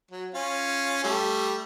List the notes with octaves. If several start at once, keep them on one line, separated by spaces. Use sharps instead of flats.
F#3
C#4 F4
G3 A3